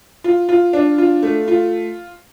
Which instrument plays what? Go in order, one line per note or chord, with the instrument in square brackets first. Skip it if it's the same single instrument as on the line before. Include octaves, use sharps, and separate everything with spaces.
[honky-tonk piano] F4
F4
D4
F4
A3
F4